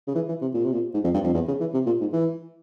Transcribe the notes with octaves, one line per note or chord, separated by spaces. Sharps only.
C#3
E3
E3
C3
A#2
C3
A#2
G#2
F2
G2
F2
E2
C#3
E3
C3
A#2
G#2
E3